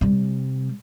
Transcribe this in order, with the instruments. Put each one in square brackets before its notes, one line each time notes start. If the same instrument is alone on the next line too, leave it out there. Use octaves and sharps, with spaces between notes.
[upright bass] C3 G3